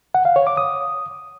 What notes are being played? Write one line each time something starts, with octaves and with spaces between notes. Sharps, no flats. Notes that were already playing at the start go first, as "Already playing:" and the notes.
F#5
F5
C#5
D6
D#6